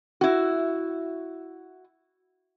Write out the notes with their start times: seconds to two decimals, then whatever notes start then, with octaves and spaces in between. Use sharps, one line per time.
0.21 E4 F#4